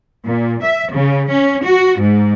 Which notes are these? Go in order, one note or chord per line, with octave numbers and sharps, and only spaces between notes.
A#2
E5
C#3
C#4
F#4
G#2